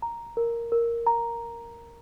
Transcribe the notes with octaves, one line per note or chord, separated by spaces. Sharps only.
A#5
A#4
A#4
A#5